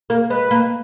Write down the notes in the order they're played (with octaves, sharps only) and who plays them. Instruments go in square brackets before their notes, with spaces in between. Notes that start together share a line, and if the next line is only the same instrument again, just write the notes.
[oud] A#3
[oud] G#3 [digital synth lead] B4
[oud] A#3